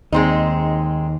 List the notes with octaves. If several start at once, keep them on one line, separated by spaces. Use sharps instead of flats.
D#2 G#3 C4 D#4